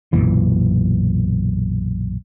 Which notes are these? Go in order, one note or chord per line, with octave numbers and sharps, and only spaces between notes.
B1 F#2 A#2 E3